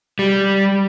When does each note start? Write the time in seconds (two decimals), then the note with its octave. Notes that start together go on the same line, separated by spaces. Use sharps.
0.19 G3